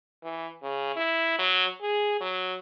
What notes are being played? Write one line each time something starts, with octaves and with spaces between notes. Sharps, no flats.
E3
C#3
E4
F#3
G#4
F#3